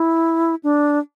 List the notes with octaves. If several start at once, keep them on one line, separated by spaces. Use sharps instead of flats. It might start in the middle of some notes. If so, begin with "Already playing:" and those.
Already playing: E4
D4